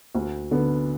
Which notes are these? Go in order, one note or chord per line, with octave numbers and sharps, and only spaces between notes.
D2
D3 B3